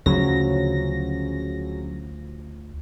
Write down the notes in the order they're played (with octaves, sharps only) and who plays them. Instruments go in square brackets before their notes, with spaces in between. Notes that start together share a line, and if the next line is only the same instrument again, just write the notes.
[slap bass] D2 F3 [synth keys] C#3 F#3 A#6